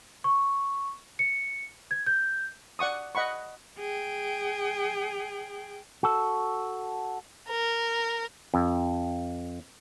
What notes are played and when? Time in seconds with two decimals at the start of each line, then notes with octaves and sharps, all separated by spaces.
0.24 C#6
1.19 C#7
1.91 G#6
2.06 G6
2.79 D5 F#5 C#6 D#6
3.15 D#5 F#5 B5 C#6
3.79 G#4 G5
6.03 F#4 A4
7.48 A#4
8.54 F2